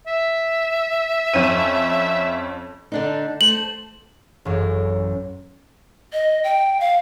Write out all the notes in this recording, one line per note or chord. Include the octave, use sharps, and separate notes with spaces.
E5
F2 C#4 D#7
D3 D4 D#4
A3 C5 F#7
A1 F#2
D#5
G5
F5